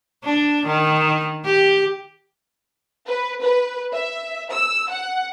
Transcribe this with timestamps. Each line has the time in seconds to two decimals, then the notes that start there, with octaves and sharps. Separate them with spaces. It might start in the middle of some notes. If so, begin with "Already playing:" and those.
0.24 D4
0.66 D#3
1.45 G4
3.07 B4
3.41 B4
3.93 E5
4.52 E6
4.90 F#5